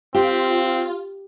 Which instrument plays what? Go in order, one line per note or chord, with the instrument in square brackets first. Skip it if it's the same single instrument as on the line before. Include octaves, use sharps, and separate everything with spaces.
[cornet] C4 [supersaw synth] F4 [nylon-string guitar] G4